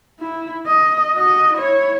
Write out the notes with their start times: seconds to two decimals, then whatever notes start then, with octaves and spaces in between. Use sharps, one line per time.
0.19 E4
0.67 D#5
1.15 F#4 D#5
1.54 E4 C#5